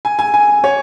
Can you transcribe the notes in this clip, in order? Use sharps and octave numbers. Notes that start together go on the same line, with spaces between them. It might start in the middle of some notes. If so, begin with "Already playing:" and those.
G#5
G#5
G#5
C#5